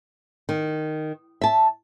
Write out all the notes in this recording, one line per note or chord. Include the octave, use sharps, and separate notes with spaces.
D#3
E5 A5